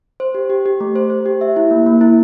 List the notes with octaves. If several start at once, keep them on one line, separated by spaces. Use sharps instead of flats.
C5
G4
G4
G4
A3
C5
C5
G4
E5
E4
A#3
A#3
E4